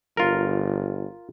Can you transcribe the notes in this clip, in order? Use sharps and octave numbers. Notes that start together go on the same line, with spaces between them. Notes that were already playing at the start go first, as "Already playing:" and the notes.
G1 F4 A#4